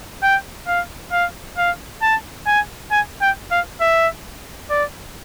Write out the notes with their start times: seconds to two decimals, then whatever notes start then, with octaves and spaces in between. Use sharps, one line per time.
0.23 G5
0.67 F5
1.12 F5
1.57 F5
2.02 A5
2.46 G#5
2.91 G#5
3.21 G5
3.51 F5
3.81 E5
4.70 D5